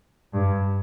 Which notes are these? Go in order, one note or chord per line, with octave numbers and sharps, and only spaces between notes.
G2